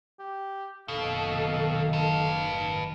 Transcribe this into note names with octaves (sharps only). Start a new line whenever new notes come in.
G4
F#1 B2 D#3 A4 F5
B4 A5